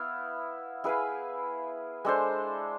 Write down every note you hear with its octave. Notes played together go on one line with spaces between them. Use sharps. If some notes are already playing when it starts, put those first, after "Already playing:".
Already playing: B3 E4 F5
E4 G#4 B4 F5
G#3 D4 A4 C5